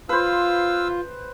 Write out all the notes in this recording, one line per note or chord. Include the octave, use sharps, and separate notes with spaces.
F4 B4 C5 F5 E6